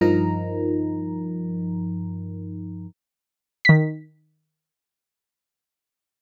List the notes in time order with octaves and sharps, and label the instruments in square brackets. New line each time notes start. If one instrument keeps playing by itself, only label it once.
[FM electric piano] G2 F3 D#4 A#4 A#5
[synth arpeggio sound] D#3 B6